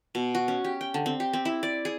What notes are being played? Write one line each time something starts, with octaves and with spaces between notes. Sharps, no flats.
B2
F#4
C#4
G4
G5
D3
C4
G4
C4
E4
D5
G#4